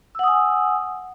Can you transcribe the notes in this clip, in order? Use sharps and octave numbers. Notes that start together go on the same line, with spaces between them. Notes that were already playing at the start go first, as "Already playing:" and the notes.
F#5 G#5 D#6 E6